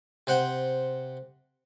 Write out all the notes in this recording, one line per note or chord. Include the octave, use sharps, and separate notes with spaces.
C3 C5 F#5 G5